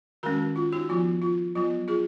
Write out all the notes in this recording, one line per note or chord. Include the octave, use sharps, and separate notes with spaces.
D#3 G#3 C#4 F#4 A#4
F4
D#4 F#4
F3 B3 F4
F4
F#3 B3 F4
F4 G#4